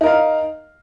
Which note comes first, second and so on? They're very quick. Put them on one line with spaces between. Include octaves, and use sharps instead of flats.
D#4 A#4 F5